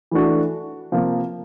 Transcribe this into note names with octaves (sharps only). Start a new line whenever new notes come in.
E3 A3 D4 F#4
C3 F3 A#3